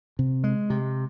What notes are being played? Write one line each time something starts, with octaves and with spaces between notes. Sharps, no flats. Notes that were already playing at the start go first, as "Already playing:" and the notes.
C3
G#3
C3